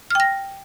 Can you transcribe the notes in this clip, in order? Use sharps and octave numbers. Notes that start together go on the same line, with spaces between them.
G5 F6 A#6